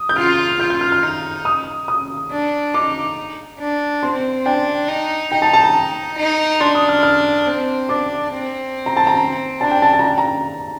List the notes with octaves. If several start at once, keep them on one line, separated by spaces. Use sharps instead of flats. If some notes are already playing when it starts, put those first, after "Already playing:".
Already playing: D#6
G6
F4 F6
F4 G6
G6
F6
F6
D#4
D#6
D#6
D4
D#4 D6
D4
C4 C6
D4 G5
D#4
D#4 G5
A5
A5
A#5
D#4
D4 C6
D#6
F6
F6
C4
D4 D6
C4
A#5
A5
A#5
D4 A5
G5
A5
A5
A#5
A5
A#5